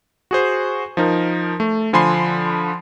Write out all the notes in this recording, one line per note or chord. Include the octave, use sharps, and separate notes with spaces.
F#4 G#4 C5
F3 D#4 A#4
A3
D3 F3 G#5 B5 C6 C7